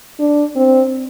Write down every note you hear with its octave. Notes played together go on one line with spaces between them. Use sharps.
D4
C4